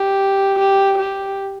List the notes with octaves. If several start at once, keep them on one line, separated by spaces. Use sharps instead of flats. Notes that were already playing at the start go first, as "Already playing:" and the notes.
Already playing: G4
G4
G4